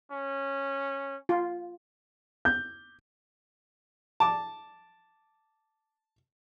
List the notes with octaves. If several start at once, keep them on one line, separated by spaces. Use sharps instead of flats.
C#4
F4
G6
A5 D6